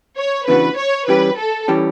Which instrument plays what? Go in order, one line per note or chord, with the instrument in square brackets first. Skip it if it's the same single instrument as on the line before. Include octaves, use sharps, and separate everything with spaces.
[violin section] C#5
[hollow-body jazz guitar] C#3 E3 B3 D4 F#4 [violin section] B4
[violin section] C#5
[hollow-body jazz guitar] E3 G3 C#4 G4 [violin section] B4
[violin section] A4
[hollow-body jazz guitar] E3 G3 C#4 G4